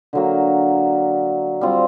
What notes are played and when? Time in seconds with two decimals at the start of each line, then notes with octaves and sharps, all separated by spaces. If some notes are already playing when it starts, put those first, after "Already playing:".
0.13 D3 F#3 A#3
1.61 G3 C4 F4